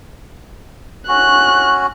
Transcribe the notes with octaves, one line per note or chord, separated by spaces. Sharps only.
C#4 F#4 F#6